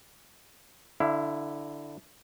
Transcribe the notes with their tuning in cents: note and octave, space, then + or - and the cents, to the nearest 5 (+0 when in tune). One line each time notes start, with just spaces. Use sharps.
D3 +0 E4 +0 F5 -45